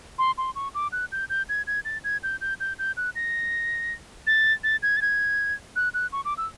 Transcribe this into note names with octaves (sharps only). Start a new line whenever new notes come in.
C6
C6
C#6
D6
F#6
G6
G6
G#6
G#6
A6
G#6
G6
G6
G6
G6
F#6
A#6
A6
A6
G#6
A6
G#6
F#6
F#6
C#6
D6
E6